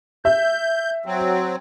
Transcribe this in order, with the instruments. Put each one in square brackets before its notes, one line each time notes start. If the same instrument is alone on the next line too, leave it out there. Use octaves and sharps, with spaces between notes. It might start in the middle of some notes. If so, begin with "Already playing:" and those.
[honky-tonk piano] E5 [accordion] G6
[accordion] F#3 C4